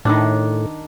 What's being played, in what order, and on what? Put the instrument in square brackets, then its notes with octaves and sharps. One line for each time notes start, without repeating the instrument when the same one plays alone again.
[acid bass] A2 [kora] D#3 D4